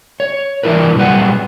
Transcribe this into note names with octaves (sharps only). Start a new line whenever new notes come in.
C#5
E3 D4 E4 A#4 B4
A#2 F#3 G3 B4 F#5